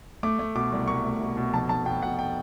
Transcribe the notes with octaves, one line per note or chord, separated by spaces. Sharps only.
A3 D6
A3
B2 D6
C2
C2 C#6
A3
B2
B2
F1 A5
F1 A5
B2 G5
B2 F#5
G5